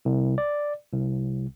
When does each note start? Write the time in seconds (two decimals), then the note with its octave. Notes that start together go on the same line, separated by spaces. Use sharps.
0.05 C2
0.38 D5
0.93 C2